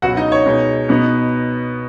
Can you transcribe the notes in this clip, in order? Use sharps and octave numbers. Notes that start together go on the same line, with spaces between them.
C#2 B2 F#3 F#4 F#5
D#4 D#5
C#5
B2 G#3 D#4
B2 B3 D#4